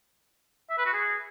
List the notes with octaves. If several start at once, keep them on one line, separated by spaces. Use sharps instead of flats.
E5
B4
F#4
G#4